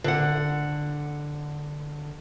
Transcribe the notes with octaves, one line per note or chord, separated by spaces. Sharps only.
D3 F#5